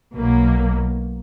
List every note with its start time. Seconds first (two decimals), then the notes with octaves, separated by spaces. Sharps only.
0.13 B1 B2 F#3 A#3